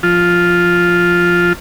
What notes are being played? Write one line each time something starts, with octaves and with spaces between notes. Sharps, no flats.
F3 F4